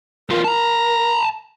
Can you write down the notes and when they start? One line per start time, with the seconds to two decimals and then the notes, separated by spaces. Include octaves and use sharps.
0.30 E2 F4 A#4
0.44 A5 A#5